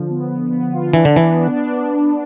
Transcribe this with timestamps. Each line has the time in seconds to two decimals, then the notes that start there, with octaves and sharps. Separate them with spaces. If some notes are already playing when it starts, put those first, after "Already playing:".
Already playing: D3 F3
0.10 B3
0.30 B3
0.51 B3
0.73 F4
0.93 E3 D4
1.05 D3
1.14 E3 B3
1.35 D4
1.56 D4